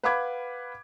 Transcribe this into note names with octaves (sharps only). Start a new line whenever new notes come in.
B4 F5 F#5 B5 D6 G#6